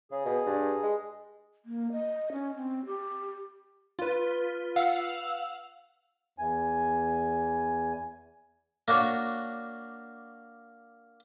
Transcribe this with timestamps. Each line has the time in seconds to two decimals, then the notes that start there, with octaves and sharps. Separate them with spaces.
0.12 C#3 G#4
0.25 B2
0.46 G2
0.83 G#3
1.65 A#3
1.92 D#5
2.32 C#4
2.56 C4
2.86 G4
3.99 F4 B4
4.76 F5 F#5 E6
6.39 E2 G#5
8.88 A#3 D4 F#4 C#5